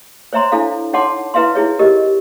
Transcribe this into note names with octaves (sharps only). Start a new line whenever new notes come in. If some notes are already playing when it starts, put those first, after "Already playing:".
C5 C#5 E5 A#5 C6
D4 E4 A4 F5
D#4 C#5 F#5 A5 C6 D6
E4 B4 E5 F5 C6
D#4 E4 G#4 C#5
G4 A#4 D#5